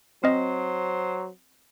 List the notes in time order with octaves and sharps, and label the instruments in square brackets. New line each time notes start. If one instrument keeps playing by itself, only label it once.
[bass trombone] F#3 [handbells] C4 D#5 [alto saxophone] C5